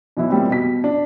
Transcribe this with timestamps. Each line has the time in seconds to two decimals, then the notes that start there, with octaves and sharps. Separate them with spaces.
0.17 B2 E3 F#3 E4
0.30 A#2 G3 C4
0.50 B2 B6
0.84 D4